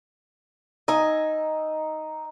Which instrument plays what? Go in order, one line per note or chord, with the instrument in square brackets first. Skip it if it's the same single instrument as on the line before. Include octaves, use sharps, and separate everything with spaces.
[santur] D#4 E6 [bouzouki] D#5 G#5